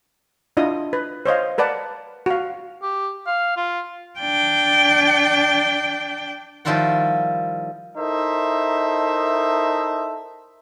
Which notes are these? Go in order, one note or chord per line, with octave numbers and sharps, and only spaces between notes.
D4 E4 F4 D#5 D#6
B4
C5 C#5 D#5 F5
A#4 B4 D5 F#5 A5
F#4 F5
G4
F5
F4
D4 G5
D#3 F3 G3 E4 F4 F#5
D#4 E4 A4 A#4 C5 E5